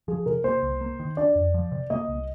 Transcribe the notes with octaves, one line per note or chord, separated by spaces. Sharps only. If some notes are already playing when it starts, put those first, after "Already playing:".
F3 G#4
C3 A#4
A#3 C5
C2
A#3
D#3
D4 D5
F2
F3
C3
A#3 D#5
C2